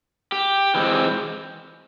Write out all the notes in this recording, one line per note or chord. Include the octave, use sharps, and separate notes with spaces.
G4
E3 G#3 C4